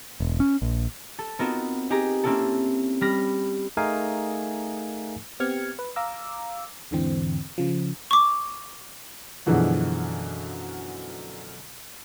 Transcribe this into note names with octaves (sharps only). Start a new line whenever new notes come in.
E1
C#4
A#1
A4
B3 C4 D#4 F4 F#4 A#4
D#4 G4 G#4 A#4 A#5
A#3 C4 C#4 E4 A4
G3 B5 F6 A#6
A3 D#4 G#4 A#4 F5 G#5
B3 C4 G4 F6 G#6 C#7
B4
F5 A#5 D6 E6
E2 G#2 D3 E3 C4
C#3 F3
C#6 D6
F#2 B2 D3 E3 F3 G#3